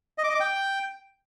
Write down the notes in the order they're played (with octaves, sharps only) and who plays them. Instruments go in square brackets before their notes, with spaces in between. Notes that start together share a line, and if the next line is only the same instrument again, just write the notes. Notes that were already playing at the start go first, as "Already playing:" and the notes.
[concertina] D#5
D6
D#5
D6
G5